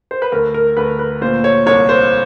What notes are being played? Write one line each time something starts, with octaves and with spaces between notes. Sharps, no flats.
C5
B4
D2 A#4
A#4
D2 B4
B4
A#2 C5
C#5
C2 C#5
C5